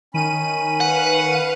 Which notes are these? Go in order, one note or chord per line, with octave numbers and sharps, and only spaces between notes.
D#3 C#4 B5 D#7
B4 F5 F#5